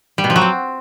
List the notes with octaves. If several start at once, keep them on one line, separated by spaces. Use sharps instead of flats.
G3
B2
F3
F#3
C4